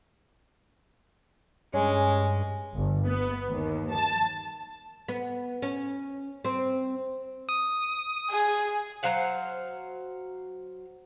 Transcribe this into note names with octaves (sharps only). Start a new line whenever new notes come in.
G2 G#3 C#4
G1
B3
D#2
A5
B3
C#4
C4
D#6
G#4
F#3 C5 F5 F#5